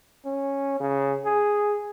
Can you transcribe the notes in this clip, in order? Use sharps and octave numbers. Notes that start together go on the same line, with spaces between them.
C#4
C#3
G#4